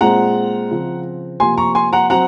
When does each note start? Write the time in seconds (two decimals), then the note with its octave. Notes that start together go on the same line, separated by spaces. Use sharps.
0.01 A#2 G#3 C4 F#5 A#5
0.71 C#3 F3 C4
1.40 C3 F3 A#3 G#5 C6
1.58 A#5 C#6
1.75 G#5 C6
1.93 F#5 A#5
2.10 F#3 C4 F#5 A#5